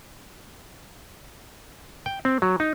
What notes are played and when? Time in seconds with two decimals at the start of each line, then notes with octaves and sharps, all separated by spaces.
2.06 G5
2.25 C4
2.42 F#3
2.60 D#4